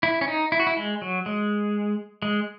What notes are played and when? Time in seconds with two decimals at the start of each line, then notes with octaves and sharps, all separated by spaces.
0.03 E4
0.21 C#4
0.28 D#4
0.52 E4
0.60 F#4
0.67 E4
0.77 G#3
1.02 F#3
1.26 G#3
2.22 G#3